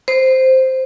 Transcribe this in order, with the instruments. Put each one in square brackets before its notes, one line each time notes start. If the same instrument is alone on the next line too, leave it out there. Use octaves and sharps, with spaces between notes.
[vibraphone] C5